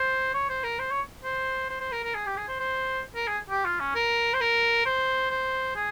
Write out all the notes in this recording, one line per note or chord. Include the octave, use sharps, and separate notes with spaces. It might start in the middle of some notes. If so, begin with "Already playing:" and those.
Already playing: C5
C#5
C5
A#4
C5
C#5
C5
C5
C5
A#4
A#4
G#4
G4
G#4
C5
C5
A#4
G#4
G4
F4
C#4
A#4
C5
A#4
C5
C5
G#4